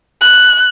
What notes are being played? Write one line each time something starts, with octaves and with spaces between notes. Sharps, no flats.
F#6